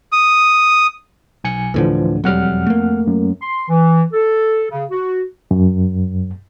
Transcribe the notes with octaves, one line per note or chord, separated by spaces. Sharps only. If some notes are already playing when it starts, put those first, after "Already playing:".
D#6
B1 G#5 C#7
D2 A2 D3 E3 F3
E1 F2 F#3 G3 F#5 F6
A3 A#3
F#2
C6
E3
A4
C#3
F#4
F#2